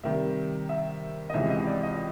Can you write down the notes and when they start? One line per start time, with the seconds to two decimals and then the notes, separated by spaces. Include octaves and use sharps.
0.03 C3 D#3 G3 E5
0.69 E5
1.30 D#5
1.34 C#2 C3 E3 G#3 E5
1.50 D#5
1.66 D5
1.83 D#5